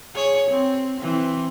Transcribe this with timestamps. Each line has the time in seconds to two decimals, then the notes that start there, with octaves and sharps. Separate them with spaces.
0.15 G#4 C#5
0.50 C4
1.00 E3 C4